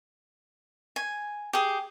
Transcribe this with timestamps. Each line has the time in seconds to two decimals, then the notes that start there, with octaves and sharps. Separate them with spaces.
0.96 G#5
1.53 G4 G#4